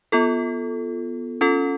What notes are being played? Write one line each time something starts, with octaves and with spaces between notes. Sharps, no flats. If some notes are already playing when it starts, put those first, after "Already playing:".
B3 F4 A4
C#4 F4 A4